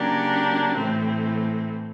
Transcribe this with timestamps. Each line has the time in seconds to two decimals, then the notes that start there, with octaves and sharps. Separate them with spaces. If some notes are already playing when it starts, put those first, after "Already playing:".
Already playing: C#3 F#3 A#3 D4 G4
0.78 A2 E3 A3 C4